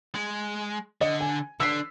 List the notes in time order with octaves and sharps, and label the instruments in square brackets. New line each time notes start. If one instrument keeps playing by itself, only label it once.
[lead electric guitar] G#3
[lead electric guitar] D3 [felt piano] D#5
[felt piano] G#5
[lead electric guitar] D3 D4 [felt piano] E6 B6 C7